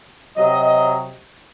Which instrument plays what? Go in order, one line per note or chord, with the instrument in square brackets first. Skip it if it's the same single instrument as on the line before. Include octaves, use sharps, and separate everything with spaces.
[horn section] C3 F#3 D#5